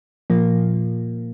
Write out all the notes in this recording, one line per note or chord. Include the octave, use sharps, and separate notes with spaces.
A#2 F3 A#3